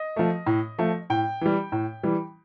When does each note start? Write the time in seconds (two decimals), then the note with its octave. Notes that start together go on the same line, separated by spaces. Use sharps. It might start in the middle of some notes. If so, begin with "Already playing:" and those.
Already playing: D#5
0.16 F3 A3
0.46 A2
0.79 F3 A3
1.10 A2 G5
1.41 E3 G3
1.72 A2
2.03 E3 G3